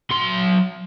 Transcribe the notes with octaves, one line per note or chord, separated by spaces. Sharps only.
F#3 C6